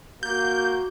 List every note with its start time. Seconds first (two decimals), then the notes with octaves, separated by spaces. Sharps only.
0.23 A#3 F#4 G6